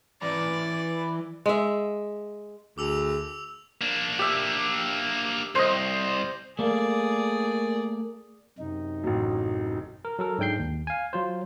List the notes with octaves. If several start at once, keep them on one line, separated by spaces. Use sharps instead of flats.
E3 D5 A#5
G#3 E5
D2 G#4 D6 E6 F7
A#3 D4
G4 E5
C2 C5 D#5
A3 A#3 G#4 D5
F#2 C3 D#4
A1 F#3
A#4
F#3 A4 A#4
G#2 G#3 D4 G5 G6 C7
D#2
F5 G#5
F#3 F4 C5